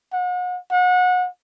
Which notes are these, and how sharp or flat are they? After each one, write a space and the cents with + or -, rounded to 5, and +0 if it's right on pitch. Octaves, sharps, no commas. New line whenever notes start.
F#5 -40
F#5 -30